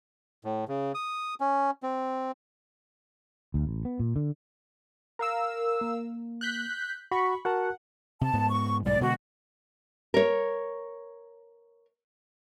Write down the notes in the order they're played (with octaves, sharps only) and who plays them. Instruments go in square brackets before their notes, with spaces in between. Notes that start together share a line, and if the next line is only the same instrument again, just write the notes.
[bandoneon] A2
C#3
D#6
C#4
C4
[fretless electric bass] D2
A1
B3
A#2
D3
[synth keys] A#4 F5 E6
[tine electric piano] A#3
[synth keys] F#6 G6 B6
[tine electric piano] F#4 [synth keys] B5 C#6
[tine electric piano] F#4 A#4 A5 [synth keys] F#5
[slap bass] C3 [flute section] A5
[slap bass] G#2 B3
[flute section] C#6
[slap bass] B1 G#2 G3 [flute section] D5
[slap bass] B2 D3 G#3 [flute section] F#4
[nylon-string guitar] A#4 C#5